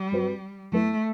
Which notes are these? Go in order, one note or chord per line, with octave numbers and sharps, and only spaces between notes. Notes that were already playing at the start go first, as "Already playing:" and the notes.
Already playing: G3
G2 F#3 C4 F#4 B4
F#2 F#3 A3 B3 E4